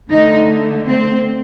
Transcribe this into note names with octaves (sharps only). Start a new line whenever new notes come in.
D3 A3 D#4
C4